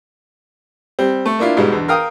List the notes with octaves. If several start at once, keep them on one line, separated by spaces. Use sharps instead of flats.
G3 C4
A3
A#3 D4 E4 F4
G#2 B2 G3 G#3
E2 D3
A#4 F5 G5 D#6